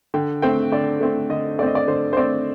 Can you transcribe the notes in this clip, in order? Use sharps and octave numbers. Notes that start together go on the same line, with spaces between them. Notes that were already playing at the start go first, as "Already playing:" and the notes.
D3 G5
A3 C4 G5
D3 D5
A3 C4
D3 D#5
A3 C4 D5 D#5
D5
D3 C5
C5
A3 C4 D5